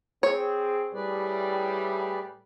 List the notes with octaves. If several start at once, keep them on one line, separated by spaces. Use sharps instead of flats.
C4 G#4 C#5
A2 G3 G#4 B4 D5